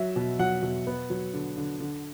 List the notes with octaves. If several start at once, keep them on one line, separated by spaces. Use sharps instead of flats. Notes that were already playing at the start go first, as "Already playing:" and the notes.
Already playing: F#3 E5
B2
F#3 F#5
B2
B3
F#3
D3
D3
D3